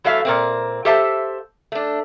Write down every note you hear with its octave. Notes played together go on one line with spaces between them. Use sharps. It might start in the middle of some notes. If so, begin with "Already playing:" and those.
E3 F#3 A3 E5 F5
A#2 A#3 C4
G4 A4 C5 E5 F5 A5
A3 D4